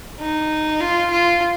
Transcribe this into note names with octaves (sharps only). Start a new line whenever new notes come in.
D#4
F4
F4